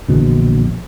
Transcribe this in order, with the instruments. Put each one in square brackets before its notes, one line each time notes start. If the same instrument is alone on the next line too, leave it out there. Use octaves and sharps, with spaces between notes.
[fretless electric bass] A#1 E2 B2 D3